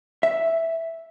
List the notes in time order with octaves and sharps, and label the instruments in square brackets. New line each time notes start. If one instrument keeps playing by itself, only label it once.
[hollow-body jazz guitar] E5